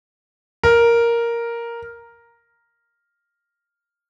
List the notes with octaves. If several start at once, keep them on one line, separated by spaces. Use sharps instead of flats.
A#4